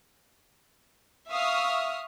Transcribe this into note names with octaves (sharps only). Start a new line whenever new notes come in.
E5 F5 C#6 D#6 F6